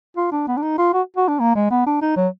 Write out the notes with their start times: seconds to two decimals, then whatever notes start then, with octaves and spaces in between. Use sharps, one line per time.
0.17 F4
0.32 D4
0.47 B3
0.57 D4
0.62 D#4
0.78 F4
0.93 F#4
1.17 F#4
1.28 D4
1.40 A#3
1.55 G#3
1.71 B3
1.86 D4
2.02 D#4
2.17 F#3